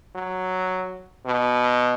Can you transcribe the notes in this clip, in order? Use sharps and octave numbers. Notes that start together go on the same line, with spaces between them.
F#3
B2